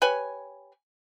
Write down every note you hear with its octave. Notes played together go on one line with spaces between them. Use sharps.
G4 B4 C#5 G#5